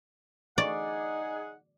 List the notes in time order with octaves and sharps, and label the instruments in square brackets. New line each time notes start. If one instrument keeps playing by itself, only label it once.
[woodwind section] D#4 G#4 F#5 [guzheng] D5